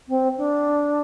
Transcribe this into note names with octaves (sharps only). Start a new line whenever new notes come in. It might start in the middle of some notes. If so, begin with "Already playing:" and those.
C4
D4